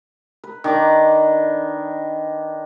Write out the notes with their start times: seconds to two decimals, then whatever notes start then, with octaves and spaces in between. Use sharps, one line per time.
0.44 B4
0.64 D#3 D4 D6